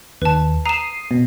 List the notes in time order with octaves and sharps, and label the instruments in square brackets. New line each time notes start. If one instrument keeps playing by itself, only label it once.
[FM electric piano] D#2 [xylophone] B4 A5
[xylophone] A#5 E7 [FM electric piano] D#6 C7
[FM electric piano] B2